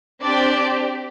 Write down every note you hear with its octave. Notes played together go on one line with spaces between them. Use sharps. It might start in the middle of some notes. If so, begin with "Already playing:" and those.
C4 D4 G4 D5